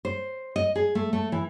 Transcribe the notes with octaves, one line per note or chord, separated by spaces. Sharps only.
C5
D#5
G#4
A3
A3
E3